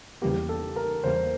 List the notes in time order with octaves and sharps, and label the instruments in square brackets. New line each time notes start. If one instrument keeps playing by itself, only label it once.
[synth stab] E2 C#3 E3 G3 A#3 [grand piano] G4
[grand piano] A4
A#4
[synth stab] E2 C#3 E3 G3 A#3 [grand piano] C5